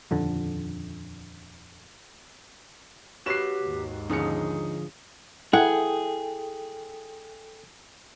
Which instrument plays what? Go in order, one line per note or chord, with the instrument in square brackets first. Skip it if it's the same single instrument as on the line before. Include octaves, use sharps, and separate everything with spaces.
[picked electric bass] D#1 F2 D3
[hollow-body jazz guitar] F#4 B4 C#5 [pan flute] G4 [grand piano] C7 E7
[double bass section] D#2 G#2
[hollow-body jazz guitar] D3 F3 C#4 [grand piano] D#4 C#7 [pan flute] G#4
[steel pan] E4 [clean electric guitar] G#4 [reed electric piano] A4 G5 [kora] F#5